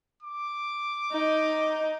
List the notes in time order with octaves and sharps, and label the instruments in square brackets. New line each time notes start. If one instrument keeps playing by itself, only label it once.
[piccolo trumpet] D6
[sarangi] D#4